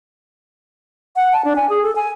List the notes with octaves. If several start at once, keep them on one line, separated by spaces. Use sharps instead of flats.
F#5
A5
D4
G#5
G#4
A4
G#5